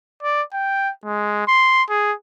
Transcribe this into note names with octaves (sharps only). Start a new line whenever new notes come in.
D5
G5
G#3
C6
G#4